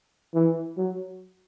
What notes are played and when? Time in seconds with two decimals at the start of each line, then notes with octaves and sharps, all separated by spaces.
0.34 E3
0.78 F#3